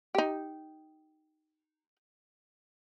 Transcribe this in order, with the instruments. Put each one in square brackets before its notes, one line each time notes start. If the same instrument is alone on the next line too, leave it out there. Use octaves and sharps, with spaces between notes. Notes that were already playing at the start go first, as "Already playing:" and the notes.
[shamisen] D#4 G4